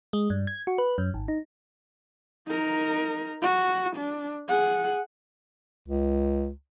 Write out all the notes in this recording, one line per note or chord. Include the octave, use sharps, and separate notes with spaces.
G#3
G2
G#6
F#4
B4
F#2
G#1
D#4
D#4 A#4
F#4
D4
G#4 F#5
C#2